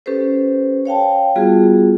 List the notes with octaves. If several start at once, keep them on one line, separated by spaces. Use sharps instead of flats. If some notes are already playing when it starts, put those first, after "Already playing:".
C#4 G4 A4 B4 C5
C#5 F5 G5 A5
G3 B3 F4 F#4 G#4